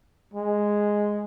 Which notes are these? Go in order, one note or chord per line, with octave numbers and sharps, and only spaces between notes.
G#3